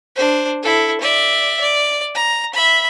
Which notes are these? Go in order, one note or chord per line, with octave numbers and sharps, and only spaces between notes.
D4 C5
E4 A4
D5 E5
D5
A#5
E5 B5